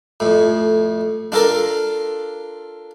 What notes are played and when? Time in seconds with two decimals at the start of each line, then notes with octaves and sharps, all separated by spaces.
0.20 F2 A2
1.32 D4 F4 A4 A#4